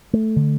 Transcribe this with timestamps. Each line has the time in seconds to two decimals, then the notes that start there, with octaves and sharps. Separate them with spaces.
0.13 A3
0.36 D3